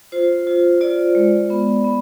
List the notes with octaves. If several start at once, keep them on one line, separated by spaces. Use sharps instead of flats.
F4 C5
F4
F4 D5
G#3
B3
B3